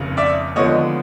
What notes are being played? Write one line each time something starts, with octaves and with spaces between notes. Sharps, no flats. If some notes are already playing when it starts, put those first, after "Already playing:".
Already playing: F1 D#2 C#3
D5 E5
D#2 D3 F3 G#3 B3 C#5 D#5